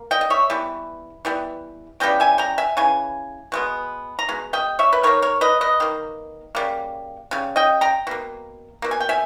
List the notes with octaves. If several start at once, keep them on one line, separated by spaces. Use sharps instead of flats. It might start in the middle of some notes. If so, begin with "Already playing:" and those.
Already playing: A#3
D#5 G5
D#5
C#5 E5
E3 G3 B3
E3 G3 B3
C#3 E3 G3 B3 D#5 G5
E5 G#5
G5 A#5
E5 G#5
C#3 E3 G#5
B2 G#3 B3
A#5
B2 G#3
D#5 G5
C#5 E5
B4
D#3 A#3 A#4 C#5
A#4 C#5
B4 D#5
B4 D#5
D#3 A#3
C#3 G3 A#3
C#3 G3
D#5 G5
G5 A#5
B2 A#3
B2 A#3
G#5
G5
E5 G#5